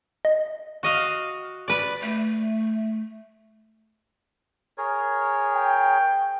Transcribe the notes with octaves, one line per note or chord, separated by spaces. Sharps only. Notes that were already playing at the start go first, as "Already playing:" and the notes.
D#5
F#4 D#5 F5
B4 D5
A3
G#4 A#4 C#5
G5